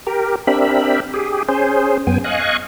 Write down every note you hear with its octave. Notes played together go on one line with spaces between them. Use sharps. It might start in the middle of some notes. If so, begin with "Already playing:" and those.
G4 A#4
C4 D4 G4 A#4 E5 B5
G4 G#4
C#4 G#4 C5
F#2 B3 G5 G#5
D#5 F5 G#5 C#6 F#6